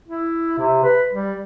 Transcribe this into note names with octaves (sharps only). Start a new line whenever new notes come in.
E4
C3
B4
G3